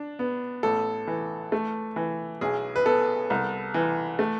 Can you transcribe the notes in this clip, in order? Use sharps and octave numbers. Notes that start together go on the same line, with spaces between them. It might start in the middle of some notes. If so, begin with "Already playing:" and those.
Already playing: D4
B3
A1 A4
E3
A3
E3
B1 G#4
B4
B3 A4
C2
E3
A3